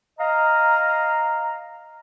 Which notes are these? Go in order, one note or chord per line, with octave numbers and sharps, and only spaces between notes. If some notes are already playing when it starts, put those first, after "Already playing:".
D#5 F5 A#5